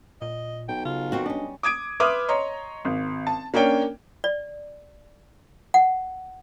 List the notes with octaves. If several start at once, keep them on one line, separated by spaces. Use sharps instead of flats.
A#2 D#5
B1 G5
C#3 F4
D#3 C4 F#4
G3 C#4 D4 D#5
D6 D#6 G#6 D7
B4 E5 C6 D6 D#6 F6
C#5 D#5 A#5 C6
G#1
A5
A#3 C#4 D4 C#5 G5
D5
F#5